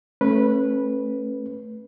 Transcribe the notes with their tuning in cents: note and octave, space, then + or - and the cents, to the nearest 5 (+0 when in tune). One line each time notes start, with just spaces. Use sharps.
A3 +0 C#4 -35 B4 -15